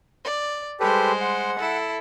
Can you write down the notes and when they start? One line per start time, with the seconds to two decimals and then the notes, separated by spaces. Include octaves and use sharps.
0.23 D5
0.80 G3 G#3 G4 A4 B4 C5
1.21 F#5
1.58 E4 A4